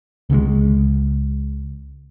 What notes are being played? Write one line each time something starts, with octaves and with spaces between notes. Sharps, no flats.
C#2 C#3 E3 G#3